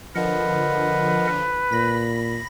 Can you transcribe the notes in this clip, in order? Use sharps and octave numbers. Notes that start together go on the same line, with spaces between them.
D3 F3 A#4 B4 D#5 F#5
A#2 B5 A#6